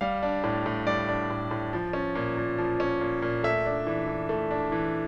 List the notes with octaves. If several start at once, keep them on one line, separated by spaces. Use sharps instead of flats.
G3 F5
D4
A2
A2
G3 D5
D4
A2
A2
F3
C#4
A#2
A#2
F3
C#4
A#2
A#2
A3 E5
D4
E3
E3
A3
D4
E3